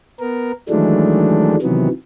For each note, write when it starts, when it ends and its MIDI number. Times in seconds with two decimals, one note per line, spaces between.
0.20 0.52 59
0.20 0.52 70
0.69 1.56 51
0.69 1.56 52
0.69 1.56 54
0.69 1.56 56
0.69 1.56 57
0.69 1.56 62
1.62 1.89 48
1.62 1.89 51
1.62 1.89 52
1.62 1.89 54
1.62 1.89 59